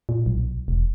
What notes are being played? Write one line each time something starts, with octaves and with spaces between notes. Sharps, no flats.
A#2
B1
E1